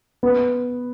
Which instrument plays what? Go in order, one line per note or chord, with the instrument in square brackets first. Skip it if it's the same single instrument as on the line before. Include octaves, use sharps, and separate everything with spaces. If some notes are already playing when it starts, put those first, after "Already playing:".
[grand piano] B3